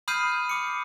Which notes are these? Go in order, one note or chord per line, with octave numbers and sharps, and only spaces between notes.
B5 D#6 F6 G6 C7 D#7
D6 C#7